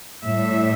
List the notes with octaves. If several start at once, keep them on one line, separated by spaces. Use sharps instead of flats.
A2 G3 E5